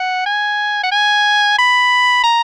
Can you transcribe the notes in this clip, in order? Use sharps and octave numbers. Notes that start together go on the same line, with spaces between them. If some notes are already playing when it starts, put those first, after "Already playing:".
Already playing: F#5
G#5
F#5
G#5
B5
A#5